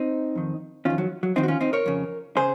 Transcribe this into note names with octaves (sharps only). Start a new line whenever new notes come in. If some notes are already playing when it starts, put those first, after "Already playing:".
Already playing: C4 D#4
F2 D#3
F2 D#3 C#4 F4
F#3
F#3
F2 D#3 C4 D#4
F#4
C#4 F4
C4 D#4
A#4 C#5
F2 C#3
C#3 G#4 C5